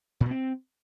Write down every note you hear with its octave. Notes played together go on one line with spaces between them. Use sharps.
A#2
B2
C4